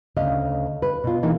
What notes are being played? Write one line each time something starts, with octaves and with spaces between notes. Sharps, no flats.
D2 C#3 D#5 F5
B4
B2 F4
E3 G#3 A#3 D#4